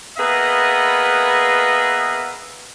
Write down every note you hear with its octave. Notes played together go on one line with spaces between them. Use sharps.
A#3 B3 G#4 B4 D#5 E5